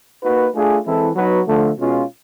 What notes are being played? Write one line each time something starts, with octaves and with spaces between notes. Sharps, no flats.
A#3 D#4 F#4 B4
A3 D4 F4 G#4
E3 G#3 C4 E4 A4
F#3 B3 D#4 F#4 B4
D3 F3 A3
B2 G#3 C#4 F4